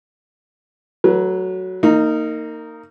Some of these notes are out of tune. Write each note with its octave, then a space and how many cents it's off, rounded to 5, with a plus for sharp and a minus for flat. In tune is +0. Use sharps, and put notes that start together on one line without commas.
F#3 +5 A3 +0 B4 -35
A#3 -25 D#4 +0